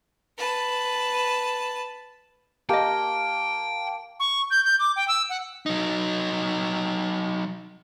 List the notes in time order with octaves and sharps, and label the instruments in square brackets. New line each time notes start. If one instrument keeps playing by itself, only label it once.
[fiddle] B4 A5
[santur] A#3 [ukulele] G4 D#5 [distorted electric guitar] G5 [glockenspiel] A5
[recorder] C#6
G6
G6
D6
G5
E6
F#5
[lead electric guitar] F#3 D#4